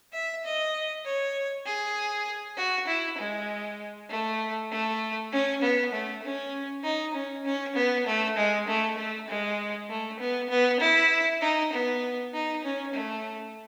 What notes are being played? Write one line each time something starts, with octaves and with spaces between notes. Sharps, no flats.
E5
D#5
C#5
G#4
F#4
E4
G#3
A3
A3
C#4
B3
A3
C#4
D#4
C#4
C#4
B3
A3
G#3
A3
A3
G#3
A3
B3
B3
E4
D#4
B3
D#4
C#4
A3